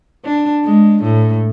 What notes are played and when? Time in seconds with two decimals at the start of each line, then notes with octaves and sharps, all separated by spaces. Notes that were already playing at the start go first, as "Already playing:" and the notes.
0.24 D4
0.64 G#3
1.03 A2